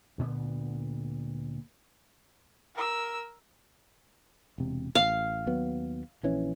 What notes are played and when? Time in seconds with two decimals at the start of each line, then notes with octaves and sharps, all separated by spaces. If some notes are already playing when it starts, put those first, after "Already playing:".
0.18 D2 A#2 D3 B3
2.75 A#4 E6
4.58 E1 C3
4.95 A1 F5
5.46 D#2 F#3 B3
6.23 A#1 E3 C#4